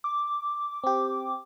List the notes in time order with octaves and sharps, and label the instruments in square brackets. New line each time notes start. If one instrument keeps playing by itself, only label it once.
[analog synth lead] D6
[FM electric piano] C4 G4